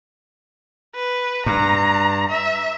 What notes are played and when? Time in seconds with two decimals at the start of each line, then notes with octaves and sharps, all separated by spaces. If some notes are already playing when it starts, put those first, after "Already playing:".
0.95 B4
1.46 G2 A#5
2.30 E5